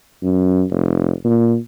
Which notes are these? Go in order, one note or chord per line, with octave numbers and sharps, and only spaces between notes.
F#2
F1
A#2